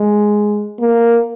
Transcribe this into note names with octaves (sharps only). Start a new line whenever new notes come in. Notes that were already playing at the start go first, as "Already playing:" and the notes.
Already playing: G#3
A#3